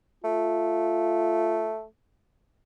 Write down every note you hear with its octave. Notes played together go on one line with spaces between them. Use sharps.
A3 F4